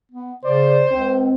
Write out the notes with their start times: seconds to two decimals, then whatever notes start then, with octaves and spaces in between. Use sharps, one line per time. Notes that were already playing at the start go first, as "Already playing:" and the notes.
0.11 B3
0.44 C#3 C5 D5
0.90 C#2 C4